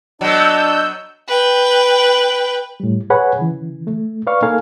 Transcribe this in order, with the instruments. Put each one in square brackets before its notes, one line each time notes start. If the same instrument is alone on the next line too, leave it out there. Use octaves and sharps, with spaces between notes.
[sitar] F#3 B3 [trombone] D4 [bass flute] D#5 [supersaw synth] E6 G6
[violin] B4 G5
[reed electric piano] A2 G3
G#4 B4 C#5 F#5 G#5 B5
C#3 E3
A3
B4 D5 F5 C#6
A#3 D#4 A4 A#4 F5 G#5